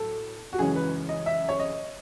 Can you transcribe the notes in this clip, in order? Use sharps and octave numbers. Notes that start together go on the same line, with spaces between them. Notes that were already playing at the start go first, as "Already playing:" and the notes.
Already playing: A2 F#3 A4
F#4
F#2 C#3 E3 G#3 C#4 G#4
B4
D#5
E5
C#5
D#5